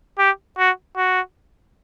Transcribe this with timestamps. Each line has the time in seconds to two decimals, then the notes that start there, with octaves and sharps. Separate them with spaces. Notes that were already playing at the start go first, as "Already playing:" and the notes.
0.19 G4
0.58 F#4
0.97 F#4